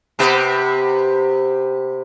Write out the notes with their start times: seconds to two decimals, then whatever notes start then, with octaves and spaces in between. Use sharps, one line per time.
0.19 C3 B3 G4